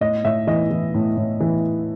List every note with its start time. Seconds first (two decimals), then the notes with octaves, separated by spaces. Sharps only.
0.01 A2 D#5
0.24 A2 E5
0.47 E3 D#5
0.71 E3
0.94 A2
1.17 A2
1.40 E3